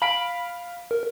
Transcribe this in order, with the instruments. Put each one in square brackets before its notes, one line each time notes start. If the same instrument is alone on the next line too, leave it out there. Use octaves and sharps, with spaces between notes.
[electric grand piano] F5 B6 D7 [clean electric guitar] B5
[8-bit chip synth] A#4